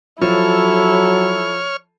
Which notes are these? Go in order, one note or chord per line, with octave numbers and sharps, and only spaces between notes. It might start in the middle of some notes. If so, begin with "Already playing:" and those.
F3 F#3 E4 A4 C#5 F6